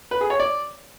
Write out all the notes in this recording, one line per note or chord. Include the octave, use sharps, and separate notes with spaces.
B4
G#4
C#5
D5